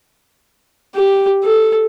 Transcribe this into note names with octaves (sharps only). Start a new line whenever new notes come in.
G4
A4